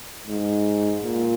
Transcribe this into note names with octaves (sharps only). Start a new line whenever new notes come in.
G#2
A#2